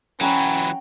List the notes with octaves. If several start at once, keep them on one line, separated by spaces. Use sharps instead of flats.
E3 F#3 C#4 F#5 G5 A#5 B5